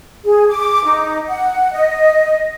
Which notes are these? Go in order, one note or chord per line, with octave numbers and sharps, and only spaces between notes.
G#4
D6
D#4
F#5
D#5